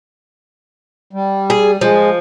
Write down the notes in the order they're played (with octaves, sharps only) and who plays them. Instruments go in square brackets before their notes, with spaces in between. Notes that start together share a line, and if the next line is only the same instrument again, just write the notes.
[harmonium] G3
[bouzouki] G#4
[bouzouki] F3 [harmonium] G#3